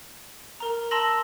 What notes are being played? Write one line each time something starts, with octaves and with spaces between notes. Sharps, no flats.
A#4 A#5
A5 A#5 C6 E6 A#6 F#7